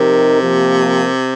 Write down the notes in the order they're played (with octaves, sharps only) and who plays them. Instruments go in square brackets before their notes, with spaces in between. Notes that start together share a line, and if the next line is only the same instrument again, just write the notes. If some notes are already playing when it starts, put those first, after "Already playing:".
Already playing: [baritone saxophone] C3 [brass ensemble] F3 D#4 G4 A#4
[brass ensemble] F3 A#3 G4 A#4